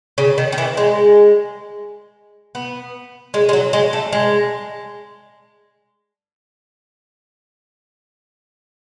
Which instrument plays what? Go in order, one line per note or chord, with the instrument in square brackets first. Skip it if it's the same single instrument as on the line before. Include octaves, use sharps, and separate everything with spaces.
[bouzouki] C#3
D#3
D#3
E3
G#3
B3
G#3
G#3
F#3
G#3
A3
G#3